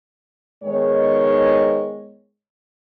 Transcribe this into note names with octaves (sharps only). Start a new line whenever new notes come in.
G#2 D#3 G#3 B3 C#5